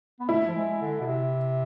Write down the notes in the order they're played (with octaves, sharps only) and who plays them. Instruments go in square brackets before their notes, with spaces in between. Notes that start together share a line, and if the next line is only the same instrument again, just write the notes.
[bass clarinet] B3
[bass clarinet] A3 [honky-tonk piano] E4
[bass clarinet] F3
G#3
D3
B2
C3